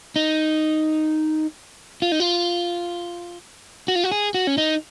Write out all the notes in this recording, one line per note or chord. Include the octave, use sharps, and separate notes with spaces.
D#4
F4
D#4
F4
F#4
F4
F#4
G#4
F#4
C#4
D#4